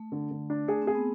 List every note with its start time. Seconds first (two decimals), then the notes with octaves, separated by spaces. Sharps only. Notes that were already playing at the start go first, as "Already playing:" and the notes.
Already playing: A3
0.12 D3
0.31 D3
0.50 D4
0.68 A3 G#4
0.82 C4
0.87 G#4
0.95 B3